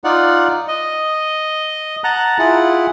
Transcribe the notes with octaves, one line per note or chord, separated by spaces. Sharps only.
D#4 F4 D5 F#5
D#5
F#5 A5 A#5 F#6
E4 F4 G#4 F#5